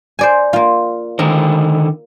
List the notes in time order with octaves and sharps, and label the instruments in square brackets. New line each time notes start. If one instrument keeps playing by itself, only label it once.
[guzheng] C5 D5 G#5
A#3 F4
[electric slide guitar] D3 D#3 C5 [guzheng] A#4